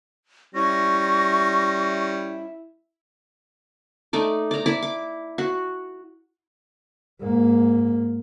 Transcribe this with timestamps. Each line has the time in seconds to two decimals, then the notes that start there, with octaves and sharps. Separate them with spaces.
0.55 G3 C#4 E4 C#6 A#6
4.13 A3 D#4 D5
4.51 D5 A#5
4.66 E4 D5
4.82 D6
5.38 F#4
7.20 G#2 A#3